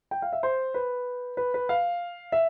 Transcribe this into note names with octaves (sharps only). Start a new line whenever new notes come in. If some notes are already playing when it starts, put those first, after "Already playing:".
G5
F5
E5
C5
B4
B4
B4
F5
E5